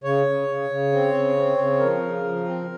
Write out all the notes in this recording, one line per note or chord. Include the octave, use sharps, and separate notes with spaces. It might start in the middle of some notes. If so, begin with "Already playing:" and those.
C#3 C#5
C#3
C#3
C#3
C4
C#3
C4
C#3
F3 A#4
C#3
F3
C4